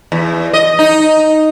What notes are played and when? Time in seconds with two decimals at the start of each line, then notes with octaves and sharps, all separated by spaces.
0.12 E2
0.53 D#5
0.79 D#4